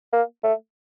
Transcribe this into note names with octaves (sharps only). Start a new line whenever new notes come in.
A#3
A3